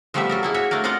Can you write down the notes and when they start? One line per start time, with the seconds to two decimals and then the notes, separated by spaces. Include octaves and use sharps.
0.14 F3 G3 A3 B3 G4 E5
0.29 F#3 A4 A#4
0.43 A#3 E4 G#4
0.54 F#4 C#5 E5
0.71 A3 A#3 D4 A#4
0.84 F4 A#4 D5 D#5 F5 F#5